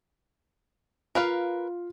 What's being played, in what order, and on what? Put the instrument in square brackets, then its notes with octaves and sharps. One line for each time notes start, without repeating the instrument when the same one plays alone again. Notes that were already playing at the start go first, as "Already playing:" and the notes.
[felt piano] F4 [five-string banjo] A#4 B4 F5